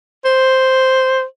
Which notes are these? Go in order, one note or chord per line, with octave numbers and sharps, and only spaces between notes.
C5